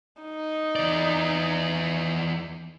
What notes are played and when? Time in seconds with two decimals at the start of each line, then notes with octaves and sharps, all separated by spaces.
0.22 D#4
0.76 E2 D5